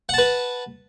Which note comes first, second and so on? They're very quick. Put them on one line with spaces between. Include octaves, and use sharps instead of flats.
F#5 A5 B4